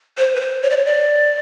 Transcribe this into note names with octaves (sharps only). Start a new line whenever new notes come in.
C5
B4
C5
C#5
D5
C#5
D5